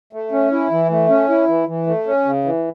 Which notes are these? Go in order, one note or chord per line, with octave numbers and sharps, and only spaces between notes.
A3
C#4
E4
E3
A3
C#4
E4
E3
E3
A3
C#4
C#3
E3